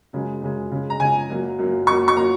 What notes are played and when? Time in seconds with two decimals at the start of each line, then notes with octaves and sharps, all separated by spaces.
0.13 F#2 C#3 G#3
0.41 F#2 C#3 G#3
0.71 C#3 G#3
0.90 A#5
1.00 C#3 G#3 G#5
1.30 F#2 F#3 A#3
1.59 F#2 F#3 A#3
1.87 F#2 F#3 A#3 C#6
2.08 C#6
2.16 F#3 A#3 A#5